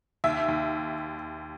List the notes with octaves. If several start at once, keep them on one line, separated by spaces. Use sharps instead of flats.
D#2 E5
D#2